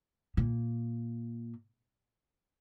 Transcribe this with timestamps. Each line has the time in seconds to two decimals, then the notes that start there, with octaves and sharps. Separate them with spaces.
0.37 A#2